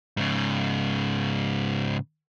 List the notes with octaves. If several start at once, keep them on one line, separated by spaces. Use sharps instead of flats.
G#2 C#3